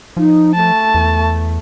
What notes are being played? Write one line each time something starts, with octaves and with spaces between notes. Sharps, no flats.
F3 D#4
A3 A5
E2